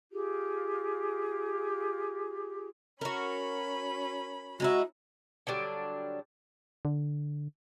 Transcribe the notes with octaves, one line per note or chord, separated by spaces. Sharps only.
F4 G4 G#4
C#4 F#4 A#4 B5
G#3 D#4 E4 F#4
D3 F#3 G3 D4
D3